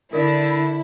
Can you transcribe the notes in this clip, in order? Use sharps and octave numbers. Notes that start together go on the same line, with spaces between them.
D3 E4 A#4 D5